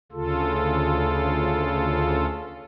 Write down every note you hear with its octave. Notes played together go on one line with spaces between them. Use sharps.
D2 C#3 F4 A4